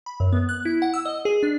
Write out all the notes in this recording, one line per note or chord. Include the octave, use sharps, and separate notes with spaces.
B5
F#2
B3
F#6
E4
F#5
E6
D#5
G#4
D4